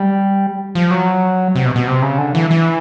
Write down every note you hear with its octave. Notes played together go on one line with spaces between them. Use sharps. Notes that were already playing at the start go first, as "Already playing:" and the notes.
Already playing: G3
F3
F#3
C3
B2
B2
C3
C#3
D3
E3
E3